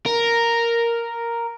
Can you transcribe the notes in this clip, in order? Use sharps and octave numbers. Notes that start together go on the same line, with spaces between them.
A#4